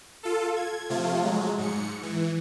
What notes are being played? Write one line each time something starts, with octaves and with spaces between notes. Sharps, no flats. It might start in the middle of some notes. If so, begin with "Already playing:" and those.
F4 A4
G#6
C3 F3 A3 F4
F#3 G#3
G#2 C#7
E3